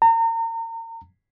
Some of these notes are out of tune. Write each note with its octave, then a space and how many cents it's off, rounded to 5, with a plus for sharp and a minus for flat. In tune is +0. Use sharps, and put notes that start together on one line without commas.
A#5 -35